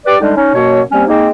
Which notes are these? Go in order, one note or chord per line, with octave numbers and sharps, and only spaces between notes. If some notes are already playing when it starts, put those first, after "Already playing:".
G4 B4 D5
D3 G3 G#3 D4 D#4
C#4 D#4
F#2 B2 A#3 C#5
C3 G3 A#3 C4 C#4
G#3 A#3 C4 D#4